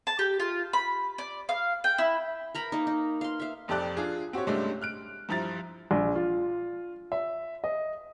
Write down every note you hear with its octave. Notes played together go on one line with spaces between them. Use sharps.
A5
G4
F4
B5
D5
F5
G5
E4
A#4 A#5 B5
A#3 D#4
D#4
F5 C6
E5 F5
F1 F2 G4 A4 D5 F#6
D4 F4 G#4
C4 F#4 G4 C#5
G2 C3 G#3 A3 C#4 D4
F6 F#6 D7
G2 F3 E4 A#5 A6
A#1
F4
E5
D#5